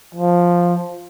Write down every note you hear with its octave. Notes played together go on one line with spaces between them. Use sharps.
F3